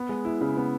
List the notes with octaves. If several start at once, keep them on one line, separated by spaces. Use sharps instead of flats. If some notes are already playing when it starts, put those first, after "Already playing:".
Already playing: B3
G#3
E4
C#3
B3